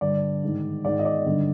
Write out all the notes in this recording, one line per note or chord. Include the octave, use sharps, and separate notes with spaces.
G2 D3 D5
G#2 D#3
G#2 D#3 D5
D#5
D5
G2 D3